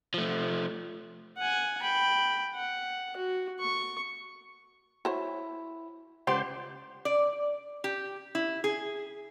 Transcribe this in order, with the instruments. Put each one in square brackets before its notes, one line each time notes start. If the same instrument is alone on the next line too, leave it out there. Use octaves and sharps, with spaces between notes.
[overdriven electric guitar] F3 A3
[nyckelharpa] F#5 G#5
G5 B5
F#5
F#4
C#6
[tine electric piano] E4 [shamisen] F#4 C5 C#5
[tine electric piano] C#2 [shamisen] G4 [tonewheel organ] C5 [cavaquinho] D5 F#5 C6
[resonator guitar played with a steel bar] D5
G4
E4
G#4